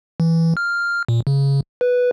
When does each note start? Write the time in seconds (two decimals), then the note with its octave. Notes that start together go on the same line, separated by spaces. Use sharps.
0.20 E3
0.57 F6
1.08 A#2
1.27 C#3
1.81 B4